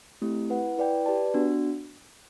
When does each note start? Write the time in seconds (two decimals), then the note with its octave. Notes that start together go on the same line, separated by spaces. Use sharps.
0.22 A3 C4 E4 G4
0.50 E4 B4 F#5
0.78 E4 B4 D5 G5
1.06 G4 B4 D5 A5
1.34 B3 D4 F#4